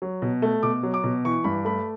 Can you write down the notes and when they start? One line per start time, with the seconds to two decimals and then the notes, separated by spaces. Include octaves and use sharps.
0.02 F#3
0.22 B2
0.42 A3
0.63 B2 D6
0.83 F#3
0.94 D6
1.04 B2
1.24 E3 C#6
1.44 G2 B5
1.65 A3 B5